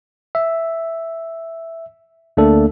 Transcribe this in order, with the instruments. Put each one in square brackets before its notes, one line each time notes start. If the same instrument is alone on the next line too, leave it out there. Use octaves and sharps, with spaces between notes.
[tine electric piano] E5
D2 A3 A#3 D4 A4